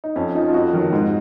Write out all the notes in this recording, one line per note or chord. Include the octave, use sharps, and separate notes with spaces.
D#4
F2 C#4
F3 D#4
F4
F2 F#4
D#3 F#3
G#2